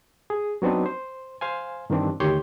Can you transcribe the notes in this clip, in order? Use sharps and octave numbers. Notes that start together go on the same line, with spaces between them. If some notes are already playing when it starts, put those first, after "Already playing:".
G#4
F#3 B3 C4 D4 D#4
C5
C5 F5 G#5
G2 D#3 E3 C4 D4
D2 D#3 G4 C#5 C6 G6